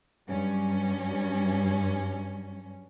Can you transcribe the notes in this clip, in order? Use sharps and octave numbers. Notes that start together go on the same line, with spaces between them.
G2 F#3 C#4